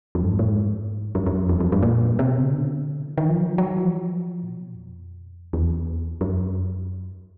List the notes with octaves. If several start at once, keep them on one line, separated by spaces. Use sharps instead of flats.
F2
G2
G#2
A2
G#2
F#2
F#2
F2
F2
F2
G2
A#2
C3
B2
C#3
D3
E3
D#3
F3
F#3
F#3
E3
F3
A#2
B2
A#2
F2
E2
F#2